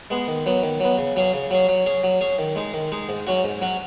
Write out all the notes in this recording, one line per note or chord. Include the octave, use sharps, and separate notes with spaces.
G#3 B3 G#4
D#3
F#3 B3
D#3
F#3 B3
C#3
F#3 C#4 G#4
C#3
F#3 C#4 G#4
F#3
C#4 G#4
F#3
C#4 G#4
D#3
G#3 D#4 G#4
D#3
G#3 D#4 G#4
G#2
F#3 C#4 F#4
G#2
F#3 C#4 F#4